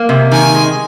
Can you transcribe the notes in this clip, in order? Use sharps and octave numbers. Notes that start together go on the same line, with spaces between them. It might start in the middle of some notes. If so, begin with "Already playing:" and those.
Already playing: A#3
C3
D#3 G#5
G#3